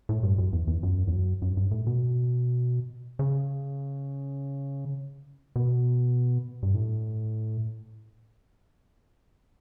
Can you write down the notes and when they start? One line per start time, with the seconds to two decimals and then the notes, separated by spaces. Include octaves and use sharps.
0.09 A2
0.23 G2
0.38 F#2
0.53 E2
0.68 E2
0.83 F#2
1.07 E2
1.13 F#2
1.42 F#2
1.57 G2
1.71 A2
1.87 B2
3.19 C#3
5.56 B2
6.63 G2
6.74 A2